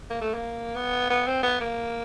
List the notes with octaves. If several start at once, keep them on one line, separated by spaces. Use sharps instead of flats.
A#3
A3
A#3
B3
B3
C4
B3
A#3